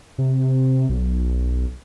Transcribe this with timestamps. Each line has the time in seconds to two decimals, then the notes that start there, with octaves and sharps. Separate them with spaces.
0.18 C3
0.90 B1